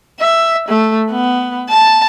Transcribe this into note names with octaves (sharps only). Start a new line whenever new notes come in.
E5
A3
B3
A5